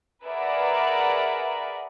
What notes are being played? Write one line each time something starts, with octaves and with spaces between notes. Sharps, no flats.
G#4 A#4 B4 D5 E5 F#5